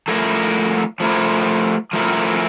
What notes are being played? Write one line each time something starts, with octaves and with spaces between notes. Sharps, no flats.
F3 A3 E4 A#4
F3 A3 E4 A#4
F3 A3 E4 A#4